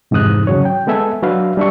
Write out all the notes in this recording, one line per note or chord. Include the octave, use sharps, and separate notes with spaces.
F2 G#2 C3 E3 D#6 F#6
C#3 F#3 C#5
G5
G#3 B3 A4 E5 G#5
F#3 D4 F#4 B4 E5 F5
G3 D4 E5 C#6